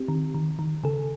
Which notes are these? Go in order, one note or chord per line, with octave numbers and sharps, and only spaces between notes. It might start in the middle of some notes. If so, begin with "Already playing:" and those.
Already playing: C4 G4
D#3
D#3
D#3
C#3 A4